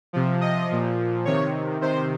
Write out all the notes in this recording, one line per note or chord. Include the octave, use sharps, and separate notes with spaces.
C3 F3
D#5
A#2 F3
C3 D#3 C#5
C3 D#3 C5